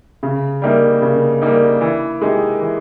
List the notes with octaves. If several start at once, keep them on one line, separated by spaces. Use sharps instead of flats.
C#3
G3 A#3 D#4
C#3
G3 A#3 D#4
E3
G#3 D#4 G4
E3